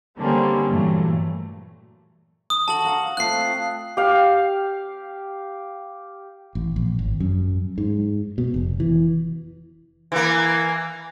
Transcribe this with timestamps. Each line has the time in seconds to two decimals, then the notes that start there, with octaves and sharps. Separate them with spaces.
0.18 D3 G3 A#3 C4 C#4
0.69 G2 A#2 E3 F#3 A3
2.50 D#6
2.68 F#4 A4 A5 F#7
2.84 F5 F#5 A#5
3.17 A3 C4 F4 F#6 C7
3.97 G4 F5
6.55 A1
6.76 A#1
6.99 G#1
7.20 F#2
7.78 G#2
8.38 B2
8.54 F1
8.80 E3
10.12 E3 A#3